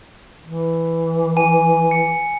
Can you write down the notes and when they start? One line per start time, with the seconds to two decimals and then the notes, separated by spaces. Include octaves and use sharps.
0.45 E3
1.37 G#5
1.91 C#7